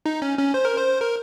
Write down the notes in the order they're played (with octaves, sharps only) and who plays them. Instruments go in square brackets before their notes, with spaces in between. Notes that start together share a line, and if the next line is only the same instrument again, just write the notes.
[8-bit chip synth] D#4
C#4
C#4
C5
A#4
C5
A#4